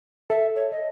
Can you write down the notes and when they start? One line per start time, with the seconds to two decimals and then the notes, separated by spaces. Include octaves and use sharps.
0.30 A4 E5
0.56 C#5
0.72 D#5